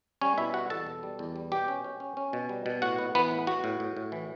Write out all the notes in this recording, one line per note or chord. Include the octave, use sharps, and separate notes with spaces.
G3 C#4 C#5
B2 E4 E5
G3 F#4 F#5
E2 A4 A5
B2
G3
E2
G3
B2 G4 G5
C#4
C#4
C#4
C#4
B2
G3
B2
A2 F#4 F#5
B3
E3 B3 B4
A2
B3 F#4
A2
A2
A2
E3